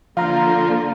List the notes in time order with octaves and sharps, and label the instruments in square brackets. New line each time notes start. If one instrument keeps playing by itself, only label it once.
[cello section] D3 A#3 [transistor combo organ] F3 [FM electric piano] F5 A#5 F6